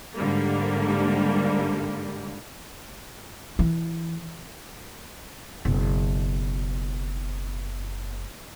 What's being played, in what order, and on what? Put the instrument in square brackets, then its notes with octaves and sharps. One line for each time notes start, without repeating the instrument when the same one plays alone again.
[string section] G#2 D3 G3 A#3
[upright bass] E3
F#1 B2